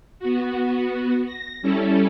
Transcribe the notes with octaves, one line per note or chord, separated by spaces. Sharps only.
B3 F#4
A#6
G3 C#4 E4 A4